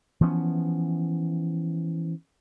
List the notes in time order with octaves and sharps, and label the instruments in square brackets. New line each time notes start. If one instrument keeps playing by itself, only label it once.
[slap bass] E3 F3 B3 C#4